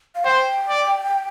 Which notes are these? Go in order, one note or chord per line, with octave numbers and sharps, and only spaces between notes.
F5
C5 G5
D5